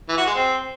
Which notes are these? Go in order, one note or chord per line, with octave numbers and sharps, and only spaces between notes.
E3
F#4
G#3
C4